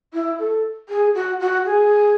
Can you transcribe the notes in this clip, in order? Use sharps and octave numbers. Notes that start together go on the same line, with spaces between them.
E4
A4
G#4
F#4
F#4
G#4